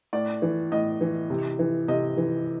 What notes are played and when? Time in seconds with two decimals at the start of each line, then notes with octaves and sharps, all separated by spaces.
0.13 A2 D5
0.42 E3
0.72 A2 D#5
1.01 E3
1.30 C3
1.59 E3
1.88 C3 D#5
2.17 E3